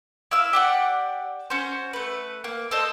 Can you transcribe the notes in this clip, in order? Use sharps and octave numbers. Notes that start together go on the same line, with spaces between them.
E4 F5 E6
G4 D5 F#5
C#4 F#4 C5
A3 B4
A#3
A4 C5 D#5